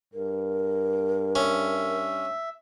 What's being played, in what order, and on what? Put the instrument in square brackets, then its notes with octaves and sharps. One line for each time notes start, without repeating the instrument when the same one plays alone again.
[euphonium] G2 [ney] A#4
[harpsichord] C#4 [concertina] E5